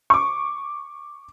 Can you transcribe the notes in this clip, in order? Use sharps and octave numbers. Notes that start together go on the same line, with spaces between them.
C#6 D6